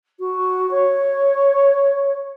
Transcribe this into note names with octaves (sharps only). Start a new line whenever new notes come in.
F#4
C#5